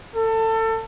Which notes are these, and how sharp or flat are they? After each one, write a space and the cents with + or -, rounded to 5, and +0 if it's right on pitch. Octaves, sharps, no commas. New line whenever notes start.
A4 +25